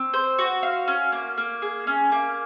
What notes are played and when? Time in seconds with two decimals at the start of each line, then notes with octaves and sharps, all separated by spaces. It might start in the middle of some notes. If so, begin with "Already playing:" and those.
Already playing: C4
0.14 C5
0.39 F#4
0.63 F5
0.88 C#4
1.12 A#3
1.37 A#3
1.62 G#4
1.87 C#4
2.12 A#3